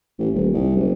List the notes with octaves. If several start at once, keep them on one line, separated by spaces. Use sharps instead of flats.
A1
D#1
C2
F#1